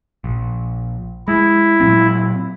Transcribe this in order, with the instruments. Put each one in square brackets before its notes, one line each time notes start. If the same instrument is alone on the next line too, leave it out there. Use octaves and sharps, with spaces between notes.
[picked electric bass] A#1
[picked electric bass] G#3 [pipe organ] E4
[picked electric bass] A#2 F#3 C4